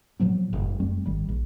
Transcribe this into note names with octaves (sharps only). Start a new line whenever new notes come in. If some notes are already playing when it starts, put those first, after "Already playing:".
A#2 F3 F#3 B3
F#1 G2
F#2 G3 A3 C4
G#1 D#3 G3
A#1